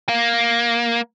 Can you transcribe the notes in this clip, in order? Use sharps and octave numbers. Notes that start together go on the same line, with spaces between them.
A#3